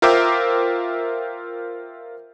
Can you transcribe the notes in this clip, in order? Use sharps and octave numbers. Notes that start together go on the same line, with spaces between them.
F4 A#4 C5 E5 G5 D6